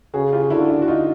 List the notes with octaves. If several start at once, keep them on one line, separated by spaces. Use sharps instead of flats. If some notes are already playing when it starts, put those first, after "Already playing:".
C#3 F#4 G#4
F4 G4
D3 E4 F#4
D4 E4
F#4
D#4 F4